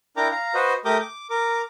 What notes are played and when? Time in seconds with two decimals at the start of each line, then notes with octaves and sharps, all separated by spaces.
0.17 D4 E4 A#4 G5 A#5 D6
0.31 F5 A#5
0.54 F#4 B4 C5 D#5
0.85 A3 G4 A#4 D6 D#6 G6
1.00 D6
1.30 A#4 D6